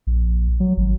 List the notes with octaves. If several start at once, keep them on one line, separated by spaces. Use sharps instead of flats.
A#1
F#3
G#1